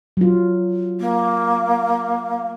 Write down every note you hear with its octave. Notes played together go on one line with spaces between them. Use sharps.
F#3 F4
A#3